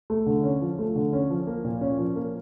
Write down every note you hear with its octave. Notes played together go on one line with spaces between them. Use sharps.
A3
D3
C#4
F3
A3
D3
C#4
F3
A#3
A#2
C#4
F3
A#3